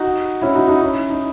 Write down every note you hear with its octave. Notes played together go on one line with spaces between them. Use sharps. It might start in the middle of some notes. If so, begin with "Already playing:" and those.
Already playing: D#4 F#4
C#4 E4
D#4 F#4
D#4 F#4
C#4 E4
D#4